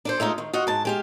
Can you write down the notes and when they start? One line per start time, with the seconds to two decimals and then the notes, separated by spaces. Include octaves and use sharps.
0.05 D4 A4 C5
0.20 G#3 A3 D#4 F4
0.38 D#3
0.53 F4 F#4 D#5 F#5
0.67 G#2 A5
0.85 G#3 G4 F5